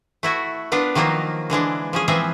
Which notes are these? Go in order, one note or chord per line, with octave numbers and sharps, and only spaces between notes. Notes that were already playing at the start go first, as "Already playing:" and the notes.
A3 E4 F#4
B3 D4 F4 B4
D#3 F3 F#3 A#3 F4
D3 E3 G#3 D4
F3 C#4 G#4
E3 F3 C4 G#4 E5